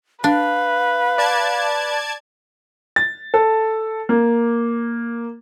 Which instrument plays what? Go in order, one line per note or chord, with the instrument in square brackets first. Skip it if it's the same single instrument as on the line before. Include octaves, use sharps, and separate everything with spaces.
[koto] D4 [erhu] B4 [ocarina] F5
[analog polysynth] D5 A5 G#6
[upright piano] A6
A4
A#3